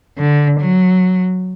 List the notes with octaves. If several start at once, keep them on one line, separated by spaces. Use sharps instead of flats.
D3
F#3